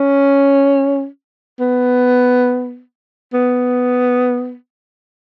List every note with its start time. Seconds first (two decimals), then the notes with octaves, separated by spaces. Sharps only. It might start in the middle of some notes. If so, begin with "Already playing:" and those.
Already playing: C#4
1.60 B3
3.33 B3